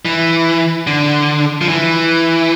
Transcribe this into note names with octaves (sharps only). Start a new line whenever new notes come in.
E3
D3
F3
E3